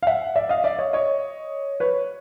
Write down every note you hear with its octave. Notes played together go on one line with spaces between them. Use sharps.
F5
E5 F#5
D5 E5
D#5 F5
D5 E5
C#5 D#5
C#5 D#5
B4 C#5